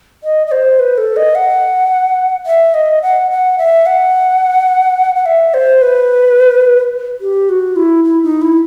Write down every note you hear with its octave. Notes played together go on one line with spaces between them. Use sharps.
D#5
D#5
C5
B4
A4
D#5
F#5
E5
D#5
F#5
F#5
E5
F#5
F#5
E5
C5
B4
G4
F#4
E4
E4
D#4
E4